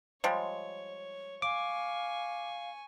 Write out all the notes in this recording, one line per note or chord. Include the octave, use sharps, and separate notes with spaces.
F3 G3 G#3 C#5
F5 G#5 C#6 D6